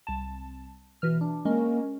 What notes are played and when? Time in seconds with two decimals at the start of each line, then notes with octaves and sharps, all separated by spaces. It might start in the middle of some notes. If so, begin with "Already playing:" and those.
0.07 C2 A5
1.02 B2 E3 F6
1.21 D4
1.45 G#3 A#3 C#4 A#4